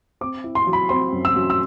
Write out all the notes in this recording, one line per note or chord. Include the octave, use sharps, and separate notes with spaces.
C4 D6
E4
C6
F#3
B5
C4 C6
F#2
E6
F#2
E6